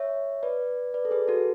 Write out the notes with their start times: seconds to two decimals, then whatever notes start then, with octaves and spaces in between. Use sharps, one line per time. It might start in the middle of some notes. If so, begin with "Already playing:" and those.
Already playing: C#5 E5
0.43 B4 D5
0.94 B4 D5
1.05 A4
1.11 G#4 B4
1.28 F#4 A4